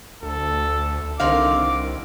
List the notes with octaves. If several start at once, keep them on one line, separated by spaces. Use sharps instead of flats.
D2 A4
C2 D3 D#3 C4 D#4 F5 D6